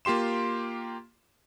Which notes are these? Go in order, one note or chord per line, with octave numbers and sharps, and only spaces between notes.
A#3 F4 G4 C6 E7